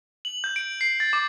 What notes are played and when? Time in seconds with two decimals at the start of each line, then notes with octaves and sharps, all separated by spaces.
0.25 F#7
0.44 G6
0.56 D7
0.81 C7
1.00 A6
1.13 D6